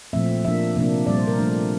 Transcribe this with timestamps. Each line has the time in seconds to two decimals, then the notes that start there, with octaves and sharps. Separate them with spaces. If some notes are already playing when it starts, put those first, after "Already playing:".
0.13 A#2 F3 A3 C4 E5
0.44 F3 A#3 D4 E5
0.76 C3 F3 A#3 D4
1.06 A#2 G3 C4 D5
1.17 C5
1.28 A#4
1.39 F3 A3 D4